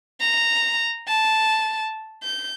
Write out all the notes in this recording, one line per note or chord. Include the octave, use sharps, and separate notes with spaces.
A#5
A5
G6